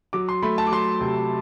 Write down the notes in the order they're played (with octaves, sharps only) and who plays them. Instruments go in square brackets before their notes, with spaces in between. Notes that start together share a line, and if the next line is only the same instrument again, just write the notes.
[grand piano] F#3 D6
C6
A3 B5
A5
D6
F#3 C6
C3